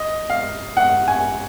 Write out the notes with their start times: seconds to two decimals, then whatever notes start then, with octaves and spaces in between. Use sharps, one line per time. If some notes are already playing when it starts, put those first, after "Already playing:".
Already playing: D#5
0.30 F5
0.77 F#5
1.08 G#5